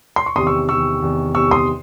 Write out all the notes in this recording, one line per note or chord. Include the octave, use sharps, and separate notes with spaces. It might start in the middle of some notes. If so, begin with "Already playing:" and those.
C6
C#6
E2 C3 D#3 C6 D#6
C#6 E6
E2 C3 D#3 C#6 E6
E2 C3 D#3
E2 C3 D#3 C#6 E6
C6 D#6